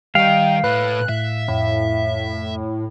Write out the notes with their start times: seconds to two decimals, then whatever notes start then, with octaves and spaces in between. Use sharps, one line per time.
0.15 D#3 G3 D#5 F5 G5
0.64 A2 B4 F#6
1.09 A2 E5
1.48 F2 A2